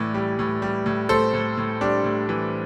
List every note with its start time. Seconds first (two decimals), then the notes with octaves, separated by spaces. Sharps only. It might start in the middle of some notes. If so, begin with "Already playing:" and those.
Already playing: A2 E3 D5
0.14 G3
0.39 A2
0.62 G3
0.86 A2
1.09 A2 A4 C5
1.34 A2
1.57 A2
1.81 G3 D4
2.04 A2
2.29 E3